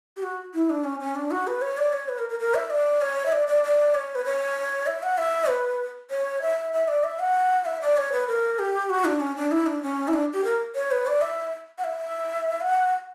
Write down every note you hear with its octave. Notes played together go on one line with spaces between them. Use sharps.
G4
F#4
E4
D4
C#4
C#4
D4
F#4
B4
C#5
D5
C#5
B4
A#4
A#4
A#4
E5
D5
C#5
E5
D5
D5
D5
C#5
B4
C#5
E5
F#5
E5
B4
C#5
E5
E5
D5
E5
F#5
E5
D5
C#5
B4
A#4
G4
F#4
D4
C#4
D4
E4
D4
C#4
E4
D4
G4
A#4
C#5
B4
D5
E5
F#5
E5
F#5